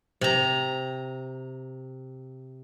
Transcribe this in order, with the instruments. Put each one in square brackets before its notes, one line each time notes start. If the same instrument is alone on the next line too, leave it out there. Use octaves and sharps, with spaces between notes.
[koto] C3 A#5